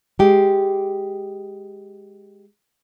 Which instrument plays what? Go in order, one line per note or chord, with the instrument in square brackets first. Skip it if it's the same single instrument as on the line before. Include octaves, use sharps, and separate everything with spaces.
[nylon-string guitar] G#3 G4